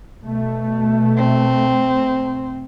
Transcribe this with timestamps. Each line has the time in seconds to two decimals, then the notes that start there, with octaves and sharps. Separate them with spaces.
0.23 B2 A3
1.17 C4